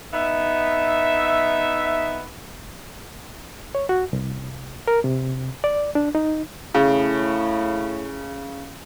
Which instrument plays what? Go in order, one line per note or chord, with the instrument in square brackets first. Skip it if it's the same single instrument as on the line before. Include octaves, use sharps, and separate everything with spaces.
[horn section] B3 D#4 E5
[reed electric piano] C#5
F#4
C2
A#4
C3
D5
D4
D#4
[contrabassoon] A2 [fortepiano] C#3